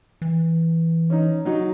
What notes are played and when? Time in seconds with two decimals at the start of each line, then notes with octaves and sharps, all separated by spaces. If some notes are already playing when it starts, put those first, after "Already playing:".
0.22 E3
1.10 C#4 D#4
1.45 F#3 D#4 F#4